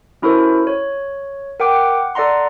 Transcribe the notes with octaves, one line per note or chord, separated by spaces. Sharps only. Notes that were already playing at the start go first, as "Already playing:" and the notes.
C#4 E4 F#4 A4 A#4 C5
C#5
A#4 F#5 G5 D6
F#5
A4 D5 F#5 A#5 C6